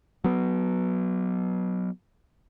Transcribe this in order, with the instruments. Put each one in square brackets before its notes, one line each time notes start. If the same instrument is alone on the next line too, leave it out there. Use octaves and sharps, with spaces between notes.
[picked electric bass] F#3 B3